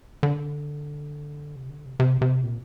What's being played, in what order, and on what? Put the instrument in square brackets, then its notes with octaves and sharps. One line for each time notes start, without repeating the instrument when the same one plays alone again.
[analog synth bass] D3
C3
D3
C3
C3
C3
A#2